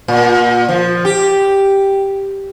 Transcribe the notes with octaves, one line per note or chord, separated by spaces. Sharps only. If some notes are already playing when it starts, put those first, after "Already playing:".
A#2
F3
G4